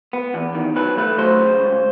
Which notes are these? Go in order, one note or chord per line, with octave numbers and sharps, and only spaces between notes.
B3
E2
D#3
F#3 B4
A3 B4
F#3 C5
C#3
C#2